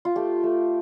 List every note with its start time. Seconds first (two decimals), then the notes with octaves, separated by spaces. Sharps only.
0.05 F4
0.16 A3 G4
0.43 A3